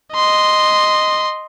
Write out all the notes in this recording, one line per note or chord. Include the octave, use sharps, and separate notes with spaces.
D#5 C6